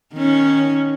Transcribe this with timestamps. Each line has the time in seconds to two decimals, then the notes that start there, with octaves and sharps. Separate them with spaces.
0.13 D#3 C#4